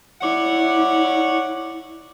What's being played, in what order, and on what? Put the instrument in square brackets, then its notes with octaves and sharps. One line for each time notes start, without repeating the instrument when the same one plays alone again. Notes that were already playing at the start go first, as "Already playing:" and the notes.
[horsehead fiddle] E4 [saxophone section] C#5 D5 F#5